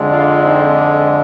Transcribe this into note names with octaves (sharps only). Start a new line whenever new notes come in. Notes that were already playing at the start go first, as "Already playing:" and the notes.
Already playing: F2 D3 G#3
D4 F4
C4 D#4
D4